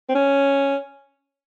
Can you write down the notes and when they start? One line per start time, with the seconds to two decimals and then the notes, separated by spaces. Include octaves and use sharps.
0.09 C4
0.15 C#4